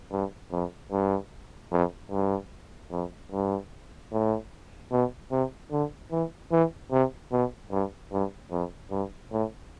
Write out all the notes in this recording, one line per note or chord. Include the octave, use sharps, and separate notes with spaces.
G2
F2
G2
F2
G2
F2
G2
A2
B2
C3
D3
E3
E3
C3
B2
G2
G2
F2
G2
A2